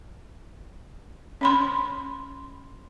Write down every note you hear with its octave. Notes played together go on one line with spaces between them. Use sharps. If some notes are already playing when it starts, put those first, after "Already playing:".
C#4 B5 C6